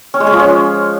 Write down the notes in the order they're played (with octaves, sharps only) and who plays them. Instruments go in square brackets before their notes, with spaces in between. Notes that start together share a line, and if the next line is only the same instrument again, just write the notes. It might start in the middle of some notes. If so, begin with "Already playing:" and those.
[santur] C#4
G#3
C#4
F3
C#4